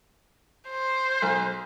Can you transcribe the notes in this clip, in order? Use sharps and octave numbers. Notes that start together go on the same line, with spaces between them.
C5
B1